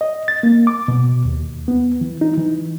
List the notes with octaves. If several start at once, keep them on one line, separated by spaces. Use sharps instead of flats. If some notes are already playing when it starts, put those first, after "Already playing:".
D#5
A6
A#3
D6
B2
D#2
B3
E3
D#4
E3